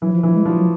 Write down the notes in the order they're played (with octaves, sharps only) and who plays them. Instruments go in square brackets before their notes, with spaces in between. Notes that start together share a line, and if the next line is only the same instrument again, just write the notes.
[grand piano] E3 [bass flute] F#3
[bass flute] F3
[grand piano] E3 [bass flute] F3
[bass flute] G#3
[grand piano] F3 [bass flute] G3
[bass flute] F#3